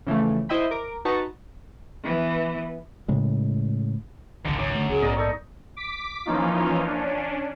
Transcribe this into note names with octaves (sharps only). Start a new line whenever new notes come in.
C#3 E3 F3 A3
E4 C5 D#5 E5 G5 B5
A#4 D6
D#4 F#4 B4 A5 A#5 C#6
E3 B3
A2 C#3 G#3
G#1 C#2 G#2 D3 D#3
F#2 D6
D3 A3
E1 C#2 G#4
A#1 G#2 B3 A#4 D5 D#5
D#4 A4 D5 C#6
D6 B6
E3 F3 A#3 C#4 D#4 F4
C#4 D4